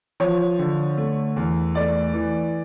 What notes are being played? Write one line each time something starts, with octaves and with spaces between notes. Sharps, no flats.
F3 C#5
D3
A3
E2
A3 D5
E3